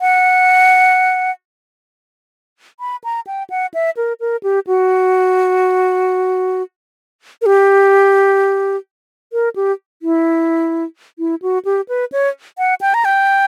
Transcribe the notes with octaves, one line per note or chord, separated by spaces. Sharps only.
F#5
B5
A#5
G5
F#5
E5
A#4
A#4
G4
F#4
A#4
G4
A#4
G4
E4
E4
F#4
G4
B4
C#5
F#5
G5
A#5
G5